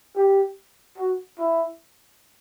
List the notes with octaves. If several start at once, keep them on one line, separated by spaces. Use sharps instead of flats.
G4
F#4
E4